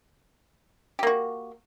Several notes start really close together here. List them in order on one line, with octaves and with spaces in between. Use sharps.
G4 A#3 F#4